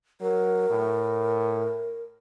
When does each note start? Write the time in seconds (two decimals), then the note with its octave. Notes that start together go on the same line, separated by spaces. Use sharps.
0.21 F#3 A#4
0.70 A2